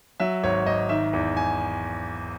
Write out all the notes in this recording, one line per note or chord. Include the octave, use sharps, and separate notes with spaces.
F#3 E5
G#1 C#5
G#1 D#5
D#3 E5
E2
G#5